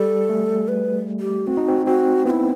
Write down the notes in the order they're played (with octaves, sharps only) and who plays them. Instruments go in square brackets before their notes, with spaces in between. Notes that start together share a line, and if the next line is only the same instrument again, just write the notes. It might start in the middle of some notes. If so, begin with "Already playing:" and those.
Already playing: [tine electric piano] G3 [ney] A4
[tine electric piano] A3
[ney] B4
G4
[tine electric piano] C4 [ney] F#4
[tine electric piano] D#4
C4
[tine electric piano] C4 [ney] F#4
[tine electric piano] B3 [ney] F#4
[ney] E4